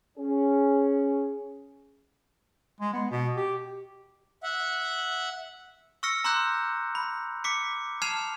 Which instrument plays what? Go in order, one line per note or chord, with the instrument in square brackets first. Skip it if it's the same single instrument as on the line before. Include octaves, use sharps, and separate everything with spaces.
[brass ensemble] C#4 G#4
[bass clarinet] G#3
B3
B2
G4
[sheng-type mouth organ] E5 F#5
[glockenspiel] C#6 E6 F6 A#6 C#7
A#5 C6 D6 E6 F#6 G6
B5
D6 B6 C#7
A5 F6 G#6 C7 E7 F7